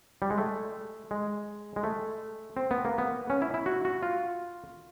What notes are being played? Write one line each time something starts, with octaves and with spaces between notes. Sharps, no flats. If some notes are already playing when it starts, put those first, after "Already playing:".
G3
G#3
A3
G#3
G#3
A3
C4
B3
A#3
B3
C#4
E4
E4
F#4
F#4
F4